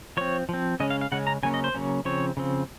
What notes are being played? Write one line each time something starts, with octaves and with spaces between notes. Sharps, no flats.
F3 C4 C#5
F3 C4
C#3 G#3 C#4 D#5
F5
F5
C#3 G#3 C#4 F#5
A#5
C#3 F#3 A#3 C#4 G#5
D#5
C5
C#3 F#3 A#3 C#4
C#3 F3 C4 C#5
C#3 F3 C4